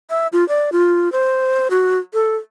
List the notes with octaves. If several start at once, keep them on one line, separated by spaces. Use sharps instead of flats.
E5
F4
D5
F4
C5
F#4
A4